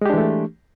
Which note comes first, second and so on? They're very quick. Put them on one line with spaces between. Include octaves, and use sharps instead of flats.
G#3 G4 D4 E3 A3